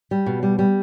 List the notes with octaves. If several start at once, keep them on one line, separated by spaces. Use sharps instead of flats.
G3
B2
G3
G3